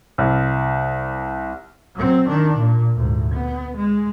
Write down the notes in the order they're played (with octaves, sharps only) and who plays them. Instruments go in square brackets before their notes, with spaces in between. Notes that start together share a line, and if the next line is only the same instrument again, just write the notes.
[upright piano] C2
[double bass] F#3 C4
D#3 D4
A#2
D2 G#2
B3
G#3